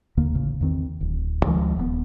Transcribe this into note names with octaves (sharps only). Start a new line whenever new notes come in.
D#2 D3 A#3
A1 C#3
E2 D#3 C4
D1
D2 D#3 F3 G#3
D#1 A#2 B3